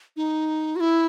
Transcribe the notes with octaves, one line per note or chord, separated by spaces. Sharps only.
D#4
F#4
E4